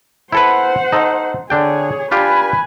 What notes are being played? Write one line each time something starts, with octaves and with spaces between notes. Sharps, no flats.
E4 A4 B4 C5 F#5
D#4 A4
D3 D4 G#4 C#5 G5
D4 F4 G4 B4 G#5